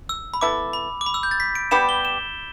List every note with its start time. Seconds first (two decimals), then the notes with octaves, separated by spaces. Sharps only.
0.09 E6
0.34 B5
0.41 B3 E4 A4 D6
0.73 B5
1.01 D6
1.06 B5
1.14 E6
1.23 G6
1.31 A6
1.40 B6
1.55 D7
1.71 G3 B3 G4 E7
1.89 G7
2.05 E7